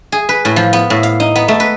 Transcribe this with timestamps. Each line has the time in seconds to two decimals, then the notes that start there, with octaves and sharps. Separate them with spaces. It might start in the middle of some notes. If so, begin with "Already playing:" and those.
0.12 G#4
0.29 B4
0.45 A2
0.56 F3
0.73 B3
0.90 A2
1.03 F5
1.20 D#4
1.36 B3
1.48 A3
1.60 B4